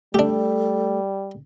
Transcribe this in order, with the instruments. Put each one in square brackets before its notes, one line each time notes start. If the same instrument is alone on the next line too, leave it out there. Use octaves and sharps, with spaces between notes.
[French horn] G3 [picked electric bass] A3 [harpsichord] D4 G4 [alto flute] A4